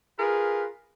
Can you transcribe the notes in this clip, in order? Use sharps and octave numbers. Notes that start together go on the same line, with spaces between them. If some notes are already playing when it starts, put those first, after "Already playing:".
F4 G#4 A#4 B4